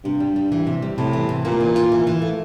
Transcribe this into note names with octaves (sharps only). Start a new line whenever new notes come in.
G2 C3
G3
G3
E3
C3
G3
A2 C3
E3
C3
A#2 A#3
E3
F4
E3
E3
A3